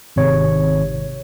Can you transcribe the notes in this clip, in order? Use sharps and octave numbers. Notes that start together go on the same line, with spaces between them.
G#1 C3 C#5